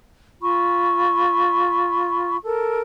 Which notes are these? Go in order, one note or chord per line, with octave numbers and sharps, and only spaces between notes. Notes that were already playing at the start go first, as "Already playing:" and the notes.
F4 B5 C#6
A4 A#4